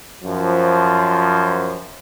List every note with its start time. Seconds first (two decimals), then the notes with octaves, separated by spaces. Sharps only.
0.24 F#2 F3